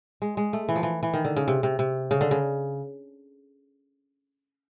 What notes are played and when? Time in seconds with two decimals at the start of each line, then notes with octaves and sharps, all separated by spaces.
0.22 G#3
0.37 G#3
0.53 A3
0.69 E3
0.76 F3
0.83 E3
1.03 E3
1.14 D#3
1.25 D3
1.37 C#3
1.48 C3
1.63 C3
1.79 C3
2.11 C#3
2.21 D3
2.31 C#3